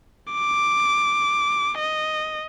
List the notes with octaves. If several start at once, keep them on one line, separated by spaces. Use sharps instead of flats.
D6
D#5